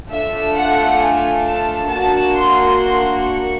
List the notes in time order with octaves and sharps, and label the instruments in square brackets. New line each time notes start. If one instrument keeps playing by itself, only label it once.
[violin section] A3 D4 F4 A4 E5
F#5
G#5
A5
A#3 D4 F#4 A5
C6
C6
C#6